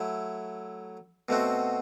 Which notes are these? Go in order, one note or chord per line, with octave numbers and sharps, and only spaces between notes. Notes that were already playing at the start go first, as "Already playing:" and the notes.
Already playing: F#3 A3 E4
B2 A3 C4 F#4